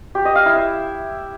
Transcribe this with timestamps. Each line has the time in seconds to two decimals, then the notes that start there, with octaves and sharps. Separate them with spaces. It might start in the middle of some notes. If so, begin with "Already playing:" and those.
0.15 G4
0.25 D#5
0.36 F5
0.46 E4
0.56 E5